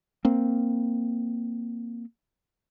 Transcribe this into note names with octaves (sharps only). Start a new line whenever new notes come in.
A#3 C4